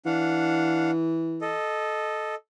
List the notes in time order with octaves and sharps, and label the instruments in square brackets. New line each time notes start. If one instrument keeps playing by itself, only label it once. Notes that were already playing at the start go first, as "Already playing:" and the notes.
[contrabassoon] E3 [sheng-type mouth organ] D4 F5 F#5
[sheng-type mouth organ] A4 D#5